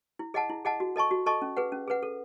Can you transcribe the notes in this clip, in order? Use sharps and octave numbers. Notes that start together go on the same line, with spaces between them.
E4
G#4 D#5 F#5 A5
E4
G#4 D#5 F#5 A5
F#4
A4 D#5 A5 C#6
F#4
A4 D#5 A5 C#6
C#4
G#4 B4 F#5
C#4
G#4 B4 F#5
A4